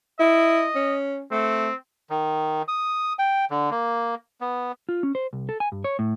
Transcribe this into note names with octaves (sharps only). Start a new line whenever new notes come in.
E4 D#5
C#4
A3 C4
D#3
D#6
G5
D3
A#3
B3
F4
C#4
C5
C2
A4
G#5
G2
C#5
A2